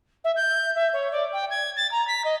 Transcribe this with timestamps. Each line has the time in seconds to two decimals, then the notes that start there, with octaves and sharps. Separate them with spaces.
0.24 E5
0.36 G6
0.75 E5
0.93 C#5
1.12 D5
1.33 G5
1.50 G#6
1.76 A6
1.91 A#5
2.07 B6
2.24 D#5